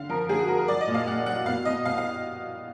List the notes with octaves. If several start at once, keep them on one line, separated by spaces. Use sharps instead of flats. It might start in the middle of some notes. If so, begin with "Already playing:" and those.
Already playing: D3 F5
F3 A#4
D3 G#4
F#4
F3 A#4
A#4
F#3 D5
D#5
A#2
F5
A#2 F#5
F#3 F#5
B2 F5
B2 D#5
B2 F5
F5